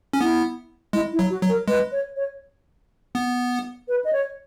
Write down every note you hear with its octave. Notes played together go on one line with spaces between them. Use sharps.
C#4
B3 E4
G#3 E4
E4
F#3
F#4
F#3
A#4
G#3 B4
C#5
C#5
B3
B4
D#5
C#5